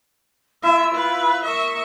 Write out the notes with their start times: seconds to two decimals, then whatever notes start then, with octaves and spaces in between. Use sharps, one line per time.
0.63 E4 F4 E5 E6
0.94 B4
1.44 A#4 E5 C#6 D#6